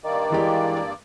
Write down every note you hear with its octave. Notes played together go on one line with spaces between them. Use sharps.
G2 D#3 A#3 D5
E3 G#3 G4